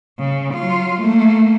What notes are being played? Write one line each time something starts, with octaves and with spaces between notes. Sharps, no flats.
C#3
F#3 F4
A3 A#3